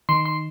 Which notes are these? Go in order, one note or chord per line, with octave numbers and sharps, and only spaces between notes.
D#3 C6
C6